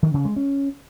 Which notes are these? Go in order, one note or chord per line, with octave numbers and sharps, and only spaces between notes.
D#3
C#3
G#3
C#4